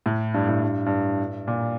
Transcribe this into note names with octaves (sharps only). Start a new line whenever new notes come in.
A2
G2
A2
G2
G2
A#2